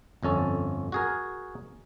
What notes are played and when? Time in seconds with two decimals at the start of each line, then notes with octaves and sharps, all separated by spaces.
0.23 G1 F2 C#4 A4
0.92 F#4 G#4 A#4